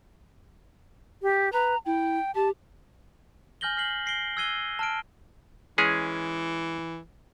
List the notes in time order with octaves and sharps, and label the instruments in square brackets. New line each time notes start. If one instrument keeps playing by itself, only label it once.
[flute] G4
[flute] B4 [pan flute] A#5
[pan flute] E4 [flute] G5
[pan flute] G4 [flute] A5
[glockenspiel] G#5 F6 G6 A#6 F#7 G7
F6 B6 C7 F#7
A#6 C7 D7 G7
E6 F#6 G#6 C7 D#7 G7
A5 F6 D7
[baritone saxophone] E3 [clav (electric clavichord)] G#3 C#4 G#4